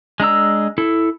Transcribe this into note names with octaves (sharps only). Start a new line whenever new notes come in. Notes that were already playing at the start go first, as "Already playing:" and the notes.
G#3 D4 A#5 E6
E4 A4